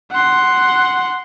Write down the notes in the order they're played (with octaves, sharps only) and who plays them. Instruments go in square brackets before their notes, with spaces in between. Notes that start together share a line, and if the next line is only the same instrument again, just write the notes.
[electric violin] F#5 C6